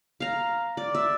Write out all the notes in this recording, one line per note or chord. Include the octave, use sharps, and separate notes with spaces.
F5 A#5
D5
E5